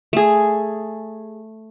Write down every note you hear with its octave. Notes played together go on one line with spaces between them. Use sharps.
A3 G#4